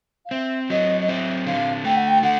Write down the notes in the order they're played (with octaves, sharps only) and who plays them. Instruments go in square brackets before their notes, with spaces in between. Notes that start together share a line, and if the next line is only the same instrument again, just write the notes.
[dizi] F5
[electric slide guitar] C4 [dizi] E5
[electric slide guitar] F#3 [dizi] D#5
[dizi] D#5
[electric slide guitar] C4 [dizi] E5
[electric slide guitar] D3 [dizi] F5
[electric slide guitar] A3 [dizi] G5
[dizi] F#5
G5
[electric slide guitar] D3 [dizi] F#5